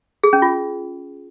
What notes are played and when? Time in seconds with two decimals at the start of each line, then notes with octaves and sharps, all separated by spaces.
0.24 G#4
0.33 C#4
0.42 F4